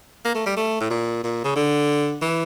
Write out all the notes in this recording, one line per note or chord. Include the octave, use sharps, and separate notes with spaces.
A#3
A3
G3
A3
A2
A#2
A#2
C#3
D3
E3